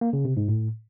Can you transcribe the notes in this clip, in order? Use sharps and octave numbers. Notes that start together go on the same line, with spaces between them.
A#3
C#3
C3
G#2
A2